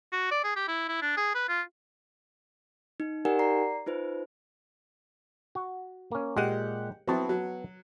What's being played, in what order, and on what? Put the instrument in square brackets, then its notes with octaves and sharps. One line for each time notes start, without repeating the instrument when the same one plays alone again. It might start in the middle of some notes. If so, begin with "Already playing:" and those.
[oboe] F#4
D5
G#4
G4
E4
E4
D4
G#4
B4
F4
[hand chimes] D#4
D#4 G4 A#4 D5 F#5 G#5
D5 A#5 C7
D#4 F4 B4 C5
[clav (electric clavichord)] F#4
A#3 C#4
[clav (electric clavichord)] A#2 G#3 [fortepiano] G4 F#5
[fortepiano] F#3 C4 E4 [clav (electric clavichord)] B3 F#4 A5
[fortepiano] F#3